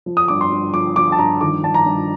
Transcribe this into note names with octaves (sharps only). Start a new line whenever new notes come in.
F3
D#6
G2 D6
C6
G2
F3 D6
F3 D6
A5
G2 A#5
D#3 D6
G2 A5
A#5
G2